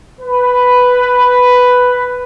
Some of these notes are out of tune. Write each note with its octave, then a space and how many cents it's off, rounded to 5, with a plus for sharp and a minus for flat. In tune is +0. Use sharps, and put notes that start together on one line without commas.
B4 +5